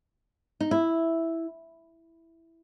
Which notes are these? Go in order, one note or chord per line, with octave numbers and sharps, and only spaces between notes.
D#4
E4